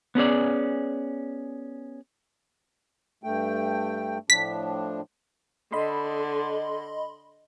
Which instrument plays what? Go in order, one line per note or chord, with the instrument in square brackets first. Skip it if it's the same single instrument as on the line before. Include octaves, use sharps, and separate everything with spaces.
[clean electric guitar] B3 C#4 G#4 D5
[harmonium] G2 A3 G5
[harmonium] A2 F3 D4 [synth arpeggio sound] B6
[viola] D3 [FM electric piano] D#5 B5 C6